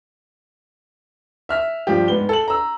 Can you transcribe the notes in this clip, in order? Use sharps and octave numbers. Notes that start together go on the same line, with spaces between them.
E5 F6 B6
G2 F3 G4
G#2 B3 G7
A4 F#7
A#5 E6